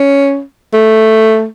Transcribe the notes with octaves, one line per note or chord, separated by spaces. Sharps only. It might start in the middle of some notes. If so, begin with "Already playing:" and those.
Already playing: C#4
A3